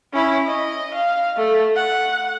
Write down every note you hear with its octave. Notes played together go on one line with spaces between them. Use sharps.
C#4 E4
D#5
F5
A3 A4
F#5